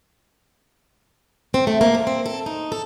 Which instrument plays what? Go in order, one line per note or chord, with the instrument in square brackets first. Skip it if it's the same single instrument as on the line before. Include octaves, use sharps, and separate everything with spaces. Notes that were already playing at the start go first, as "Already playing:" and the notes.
[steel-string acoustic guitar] C4
A3
A#3
G#2
C4
A4
D#4
A4